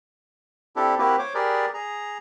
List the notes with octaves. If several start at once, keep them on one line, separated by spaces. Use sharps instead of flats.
C4 D4 E4 G4 A4
A#3 C4 E4 F#4 G4 B4
C5 C#5 D6
G4 G#4 A#4 B4 D5
G#4 A#5